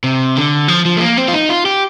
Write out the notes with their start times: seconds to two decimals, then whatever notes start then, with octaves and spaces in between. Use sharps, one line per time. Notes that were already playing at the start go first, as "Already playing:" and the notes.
0.04 C3
0.37 D3
0.68 F3
0.85 F3
0.97 A3
1.01 A#3
1.17 C4
1.28 F4
1.33 D#4
1.49 F4
1.66 G4